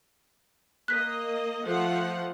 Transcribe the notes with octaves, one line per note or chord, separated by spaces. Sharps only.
A#3 D#5 F#6 B6
F3 A3 F#5